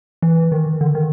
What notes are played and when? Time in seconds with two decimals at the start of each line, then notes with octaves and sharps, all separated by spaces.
0.23 E3
0.52 D#3
0.81 D3
0.95 D#3